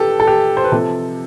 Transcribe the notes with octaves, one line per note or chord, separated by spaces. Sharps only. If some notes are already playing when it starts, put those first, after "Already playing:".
Already playing: G4 A4 B4
A4
G4
C5
B4
C3 F3 A4